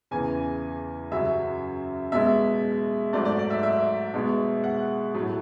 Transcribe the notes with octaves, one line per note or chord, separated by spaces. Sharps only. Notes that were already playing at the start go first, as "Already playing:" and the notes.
E2 C#3 E3 G#5
F#2 C#3 F#3 E5
B2 G#3 E5
G#2 F#3 A3 D5
D5
D5
E5
E5
B2 G#3
F#5
A2 F#3 A3